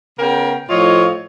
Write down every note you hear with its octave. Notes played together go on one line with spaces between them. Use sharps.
C#3 B3 A#4 G5
A2 F3 F4 C#5 D#5